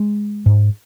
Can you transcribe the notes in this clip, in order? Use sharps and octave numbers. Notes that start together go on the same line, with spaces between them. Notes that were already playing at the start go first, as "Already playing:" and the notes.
Already playing: G#3
G#2